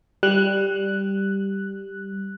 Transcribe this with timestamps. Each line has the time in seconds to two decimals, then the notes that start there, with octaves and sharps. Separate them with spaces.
0.23 G3 F#6